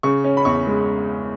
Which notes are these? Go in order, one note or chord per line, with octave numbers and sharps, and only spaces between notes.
C#3 C#6
C#4
B5
E2 C#6
G#3